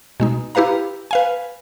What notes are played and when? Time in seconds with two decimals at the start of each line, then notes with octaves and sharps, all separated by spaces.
0.20 B2 G#3 D#4
0.55 E4 G4 B4 F5 A#5
1.11 B4 F5 G#5